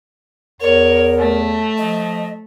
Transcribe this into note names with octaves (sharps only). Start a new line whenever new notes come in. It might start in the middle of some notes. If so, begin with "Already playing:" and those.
E2 A#4 C#5
A3
F3 D#5